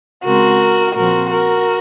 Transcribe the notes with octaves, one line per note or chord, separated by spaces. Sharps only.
C#3 G#3 C4 F#4 A#4
A#2 F3 C4 F#4 A#4
F#4 A#4